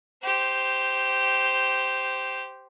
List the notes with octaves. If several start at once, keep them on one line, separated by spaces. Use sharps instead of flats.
G4 C5